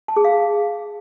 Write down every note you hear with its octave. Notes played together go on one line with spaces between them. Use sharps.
A5
G#4
F5